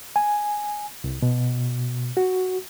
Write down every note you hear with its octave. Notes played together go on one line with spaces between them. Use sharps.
G#5
C2
B2
F#4